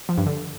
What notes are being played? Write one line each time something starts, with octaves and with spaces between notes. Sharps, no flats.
F3
G2
D3